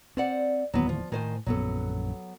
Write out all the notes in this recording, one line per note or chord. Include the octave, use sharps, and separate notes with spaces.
C4 C5 D5 F#5
D1 D#2 E3 F#3 B3
F3
A2 D#3 C5 G#5
A#1 F#2 F#3 B3 A4